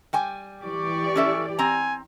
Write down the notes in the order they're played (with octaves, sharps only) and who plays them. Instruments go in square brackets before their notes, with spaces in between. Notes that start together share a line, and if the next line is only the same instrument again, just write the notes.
[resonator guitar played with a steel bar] G3 G5 G#5
[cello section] E3 G4 D5 [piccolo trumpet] C#6
[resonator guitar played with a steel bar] C#4 A4 E5
[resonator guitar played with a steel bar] C4 A#5 [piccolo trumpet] G#5